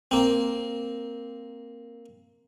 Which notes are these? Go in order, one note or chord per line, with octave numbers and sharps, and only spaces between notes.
A#3 C4